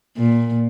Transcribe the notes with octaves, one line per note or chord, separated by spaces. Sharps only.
A#2